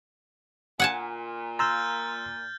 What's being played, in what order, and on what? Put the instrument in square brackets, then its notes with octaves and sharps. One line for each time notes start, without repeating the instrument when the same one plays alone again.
[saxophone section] A#2 [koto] F#5 G#5 A5
[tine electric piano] A#5 C6 E6 [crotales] F6 G6 A6